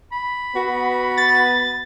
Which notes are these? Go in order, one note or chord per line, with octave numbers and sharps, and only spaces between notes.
B5
B3 F#4
A6